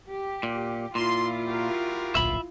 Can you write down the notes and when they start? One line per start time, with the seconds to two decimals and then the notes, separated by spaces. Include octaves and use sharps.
0.10 G4
0.43 A#2
0.95 A#2 E4 F4 C6
1.48 F#4 G4 A#4
2.15 D1 A#1 E5 B5